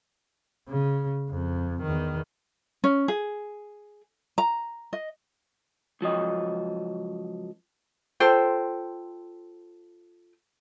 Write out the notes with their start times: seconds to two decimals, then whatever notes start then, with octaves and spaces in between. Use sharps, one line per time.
0.69 C#3
1.30 F2
1.82 E2 D#3
2.84 C#4
3.08 G#4
4.38 A#5
4.93 D#5
6.01 C#2 F3 F#3 D#5
8.20 F4 A4 C5 G5